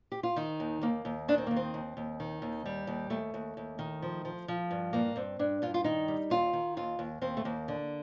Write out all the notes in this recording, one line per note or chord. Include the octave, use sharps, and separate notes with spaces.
G4
F4
D#3 D#4
D#2
D#2 A#3
D#2
D#3 D4
C4
D#2 A#3
C4
D#2
D#2
D#3
D#2
G3
D#2
D#2 A3
D#2
D#2
D#3
F3
F3
F3
G2
G2 A#3
G2 C4
G2 D4
G2 F4
F4
D#3 D#4
G3
D#2 F4
D#3
D#2 F4
D#2
D#2 C4
A3
D#2 A#3
D3